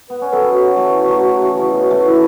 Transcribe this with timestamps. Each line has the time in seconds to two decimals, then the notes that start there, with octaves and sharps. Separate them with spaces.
0.10 B3 B4
0.22 C#4
0.33 F#3 B3 A4
0.53 F#4
0.76 E3 A3
1.08 C#3 F#3
1.42 E3
1.58 C#3
1.75 B2
1.91 E3 A3
2.07 E3 E4